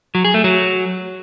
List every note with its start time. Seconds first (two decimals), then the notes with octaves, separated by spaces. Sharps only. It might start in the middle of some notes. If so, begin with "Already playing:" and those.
0.15 F#3
0.24 G#4
0.34 A3
0.44 F#3